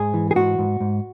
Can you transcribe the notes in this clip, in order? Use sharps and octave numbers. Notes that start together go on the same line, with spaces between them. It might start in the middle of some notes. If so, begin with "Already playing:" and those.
Already playing: G#2 G#4
E3
G#4
G#2 F#4
G#2
G#2